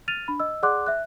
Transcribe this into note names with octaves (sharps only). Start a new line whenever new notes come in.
F6 A6 D#7 F7
D4 B5
D#5 E6
G#4 D5 F#5 C6 D6 F#6
E5 F#6